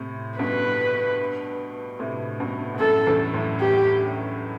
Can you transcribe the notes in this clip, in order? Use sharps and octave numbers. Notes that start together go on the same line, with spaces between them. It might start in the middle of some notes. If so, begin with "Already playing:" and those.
Already playing: A2 C3
G2 B2 B4
A2 C3
G2 B2
B2
F#2 A2 A4
E2 G2
F#2 A2
G4